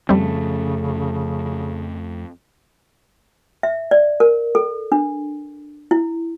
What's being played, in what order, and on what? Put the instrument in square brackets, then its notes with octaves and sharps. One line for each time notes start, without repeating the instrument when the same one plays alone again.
[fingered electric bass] F2 F3 C#4 [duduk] C#3 [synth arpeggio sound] G3 C4 [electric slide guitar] A3
[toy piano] E5
D5
A#4
A4
D4
E4